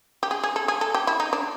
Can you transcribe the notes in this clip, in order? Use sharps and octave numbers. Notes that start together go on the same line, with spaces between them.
G4
G#4
G#4
A4
G#4
A4
G4
E4
D#4
D4